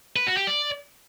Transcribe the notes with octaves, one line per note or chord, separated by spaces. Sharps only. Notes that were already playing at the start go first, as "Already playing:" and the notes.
B4
F#4
G4
D5